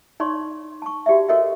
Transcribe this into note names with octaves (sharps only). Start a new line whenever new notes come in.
D#4 C#5 D5 C6 C#6
A5 C#6
F#4 G4 D5 E5
F#4 A4 A#4 C#5 D#5 E5